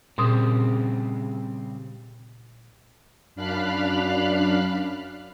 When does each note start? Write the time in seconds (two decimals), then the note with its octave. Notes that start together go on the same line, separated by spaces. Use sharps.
0.18 A#2 C#3 G3 C4 C6 D#6
3.36 F#2 D4 F5 B5 F6 F#6